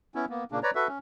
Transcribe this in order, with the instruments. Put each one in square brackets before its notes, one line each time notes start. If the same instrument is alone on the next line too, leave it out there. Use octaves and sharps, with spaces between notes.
[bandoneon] B3 C#4 E4
A#3 B3
A#2 C#3 A#3 D4
B4 C#5 D5 A#5
F#4 A4 B4 E5
C#4